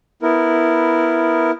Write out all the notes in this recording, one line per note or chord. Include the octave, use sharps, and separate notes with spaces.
B3 E4 A#4